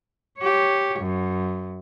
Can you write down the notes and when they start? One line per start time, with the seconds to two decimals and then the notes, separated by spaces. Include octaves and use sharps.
0.39 G4 C#5
0.99 F#2